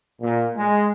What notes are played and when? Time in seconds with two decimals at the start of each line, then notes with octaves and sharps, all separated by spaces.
0.22 A#2
0.57 G#3